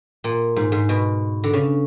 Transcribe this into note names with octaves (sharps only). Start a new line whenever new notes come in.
A#2
G#2
G#2
B2
D3
C#3